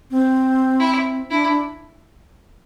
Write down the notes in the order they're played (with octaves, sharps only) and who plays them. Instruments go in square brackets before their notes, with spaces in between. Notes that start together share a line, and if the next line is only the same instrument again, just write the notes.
[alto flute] C4
[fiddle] E4
[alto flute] D4 [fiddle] E4
[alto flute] D4